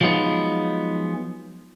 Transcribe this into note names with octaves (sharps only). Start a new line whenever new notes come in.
F3 F#3 G#3 B3 D#4